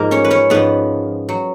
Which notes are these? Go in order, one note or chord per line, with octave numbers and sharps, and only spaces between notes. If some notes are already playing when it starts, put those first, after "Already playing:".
Already playing: G#2 F3 A#3 A#4
C#4 C#5
B4
C#4 C#5
G#2 F3 B3 B4
F#3